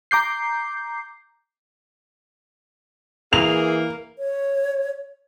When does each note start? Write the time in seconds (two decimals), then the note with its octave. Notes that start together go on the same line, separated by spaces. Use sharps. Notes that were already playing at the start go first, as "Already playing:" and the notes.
0.11 A#5 D6 G6 C7
3.33 E3 A#3 G#4 F7
4.19 C#5